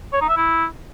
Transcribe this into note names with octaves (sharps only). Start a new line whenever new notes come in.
C#5
D#4
E5
E4